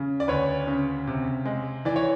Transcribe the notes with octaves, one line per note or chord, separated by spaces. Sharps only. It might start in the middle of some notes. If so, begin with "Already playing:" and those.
Already playing: C#3
D5
D2 B4 C#5
C#3
C3
G#3
E3 D5
C#5